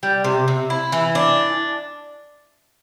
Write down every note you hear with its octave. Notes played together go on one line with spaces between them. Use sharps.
G3
C3
C3
E4
E3
D4